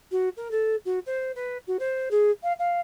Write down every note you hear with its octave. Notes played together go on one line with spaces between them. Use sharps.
F#4
A#4
A4
F#4
C5
B4
F#4
C5
G#4
F5
F5